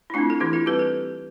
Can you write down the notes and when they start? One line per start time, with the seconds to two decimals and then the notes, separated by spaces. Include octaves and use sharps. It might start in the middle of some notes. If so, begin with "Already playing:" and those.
0.10 E4
0.14 A3 D4 F4
0.18 C4
0.30 A4
0.40 E3 E4 G4
0.53 F4 A4
0.66 G3 C4 G4 B4
0.79 A4